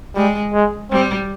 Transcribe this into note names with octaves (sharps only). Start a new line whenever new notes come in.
G3 G#3
G#3
G3 C4